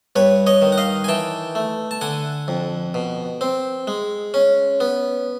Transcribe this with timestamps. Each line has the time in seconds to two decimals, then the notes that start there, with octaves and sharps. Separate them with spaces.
0.16 G2 B4 C#5
0.47 C#5 D#5
0.62 D#3
0.72 F#5
0.78 D#5 F5
1.04 G#5
1.08 E3 G5 A5
1.55 A3
1.91 A5
2.01 D3 F#5 G#5
2.48 F2
2.94 B2
3.41 C4
3.87 G#3
4.34 C#4
4.80 B3